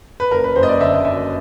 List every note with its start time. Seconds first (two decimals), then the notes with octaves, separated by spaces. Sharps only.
0.20 B4
0.31 F#1 A#4
0.44 B4
0.56 F#1 C5
0.63 D#5
0.68 D5
0.80 D3 E5
0.94 D#5
1.04 F#2 E5